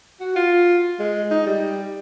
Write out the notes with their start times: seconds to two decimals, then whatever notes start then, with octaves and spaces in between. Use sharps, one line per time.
0.20 F#4
0.36 F4
0.99 G#3
1.31 D#4
1.46 G3